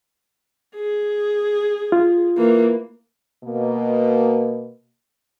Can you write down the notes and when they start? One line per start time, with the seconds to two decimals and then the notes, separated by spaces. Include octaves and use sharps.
0.75 G#4
1.92 F4
2.37 E3 A#3
3.44 B2 A#3